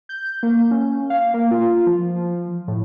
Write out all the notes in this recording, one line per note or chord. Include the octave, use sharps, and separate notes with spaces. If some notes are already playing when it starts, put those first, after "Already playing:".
G6
A#3
C#4
F5
A#3
F4
F3
A2